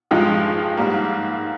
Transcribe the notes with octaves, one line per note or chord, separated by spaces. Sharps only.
G2 F3 G#3 D#4 G4
G#2 G3 A#3